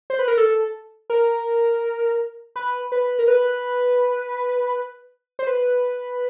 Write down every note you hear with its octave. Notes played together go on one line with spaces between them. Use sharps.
C5
B4
A#4
A4
A#4
B4
B4
A#4
B4
C5
B4